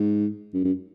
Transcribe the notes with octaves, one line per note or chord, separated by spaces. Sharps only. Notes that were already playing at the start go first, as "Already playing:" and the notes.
Already playing: G#2
F#2
F#2